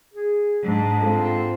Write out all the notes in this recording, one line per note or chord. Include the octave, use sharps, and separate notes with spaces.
G#4
G#2 D4
C4 F4 A4